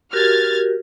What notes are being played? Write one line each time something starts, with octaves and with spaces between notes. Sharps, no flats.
F#4 G4 A#4 F6 G#6 A6